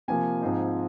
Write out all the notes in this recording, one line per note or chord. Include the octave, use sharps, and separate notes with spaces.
C3 F3 A#3 G#5
G#2 F3 C4 D#4